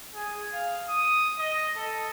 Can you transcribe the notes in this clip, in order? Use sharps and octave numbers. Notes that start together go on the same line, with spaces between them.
G#4
F5
D#6
D#5
A4